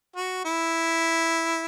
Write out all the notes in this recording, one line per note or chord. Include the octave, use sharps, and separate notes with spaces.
F#4
E4